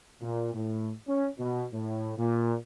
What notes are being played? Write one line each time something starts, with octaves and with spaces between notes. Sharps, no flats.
A#2
A2
C#4
B2
A2
A#2